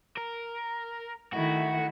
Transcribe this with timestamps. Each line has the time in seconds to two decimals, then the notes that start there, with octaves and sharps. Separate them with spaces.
0.17 A#4
1.33 D#3 A3 E4 F#4